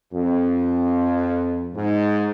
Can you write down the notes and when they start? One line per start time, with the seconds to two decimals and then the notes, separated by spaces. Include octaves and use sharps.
0.13 F2
1.74 G#2